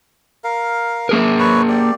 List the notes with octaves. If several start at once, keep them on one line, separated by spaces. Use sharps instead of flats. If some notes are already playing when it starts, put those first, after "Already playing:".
A#4 F5
A#3 G#4 A#4
B4 C#5 C#6
G4 D5